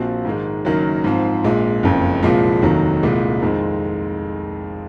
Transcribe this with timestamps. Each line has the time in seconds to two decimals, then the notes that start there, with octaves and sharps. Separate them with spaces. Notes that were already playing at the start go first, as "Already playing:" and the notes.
Already playing: A#1 A#2 F3 C4 F#4
0.25 G#2 D#3 G#3
0.65 F#1 F#2 D#3 F#3
1.04 G#2 F3 C4
1.44 A#1 A#2 G#3
1.83 F#1 F2 C#3
2.23 C2 A#2 F3 G#3
2.62 F1 D#2 D#3 F#3
3.03 C2 A#2 G#3
3.42 F2 D#3 G#3 C4